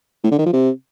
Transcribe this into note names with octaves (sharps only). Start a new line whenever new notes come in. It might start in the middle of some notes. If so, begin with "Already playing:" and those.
A2
D3
D#3
F3
C3